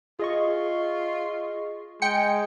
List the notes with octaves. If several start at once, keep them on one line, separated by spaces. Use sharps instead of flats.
F4 G#4 D#5 C#6
G#3 G5 C#7